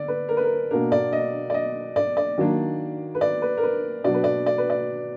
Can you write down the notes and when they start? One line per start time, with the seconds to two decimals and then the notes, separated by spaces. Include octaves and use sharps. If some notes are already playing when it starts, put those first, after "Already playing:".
Already playing: D3 D5
0.08 B4
0.29 A#4
0.37 B4
0.44 A#4
0.71 B2 A#3 D4 A#4
0.92 D5
1.13 D#5
1.50 D5
1.54 D#5
1.96 D5
2.17 D5
2.38 D#3 F#3 A#3 D4
3.15 B4
3.21 D5
3.42 B4
3.57 A#4
3.63 B4
4.04 B2 F#3 D4 D5
4.14 B4
4.24 D5
4.46 D5
4.58 B4
4.70 D5